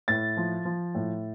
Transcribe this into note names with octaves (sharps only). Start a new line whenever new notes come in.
A2 A6
F3
F3
A2